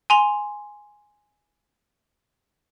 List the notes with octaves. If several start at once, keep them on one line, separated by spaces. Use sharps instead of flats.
G#5 C6 F7